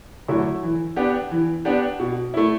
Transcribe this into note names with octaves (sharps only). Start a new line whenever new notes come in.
D3 F#3 A3 E4
E3
B3 D4 G4
E3
B3 D4 G4
B2
A3 E4